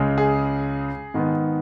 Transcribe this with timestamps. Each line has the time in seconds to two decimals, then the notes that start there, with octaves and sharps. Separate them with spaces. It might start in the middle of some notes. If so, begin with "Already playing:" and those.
Already playing: C#2 C#3 G#3
0.18 G#4
1.14 G#2 D#3 B3